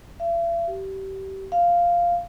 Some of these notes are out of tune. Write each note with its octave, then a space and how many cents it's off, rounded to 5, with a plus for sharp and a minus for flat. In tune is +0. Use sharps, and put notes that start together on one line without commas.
E5 +45
G4 -30
F5 -5